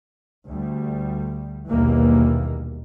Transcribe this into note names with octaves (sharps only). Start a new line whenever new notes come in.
D2 G3
A#1 D#2 B2 E3 G3 A#3